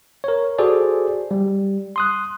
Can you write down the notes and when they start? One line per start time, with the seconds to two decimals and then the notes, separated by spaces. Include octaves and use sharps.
0.24 A#4 C#5
0.58 F#4 G#4 A4 C5 D5
1.31 G3
1.96 C6 D#6 F#6